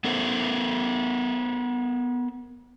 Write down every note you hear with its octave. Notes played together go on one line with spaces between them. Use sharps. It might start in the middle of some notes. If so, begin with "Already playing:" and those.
B3 A4 A#4 C5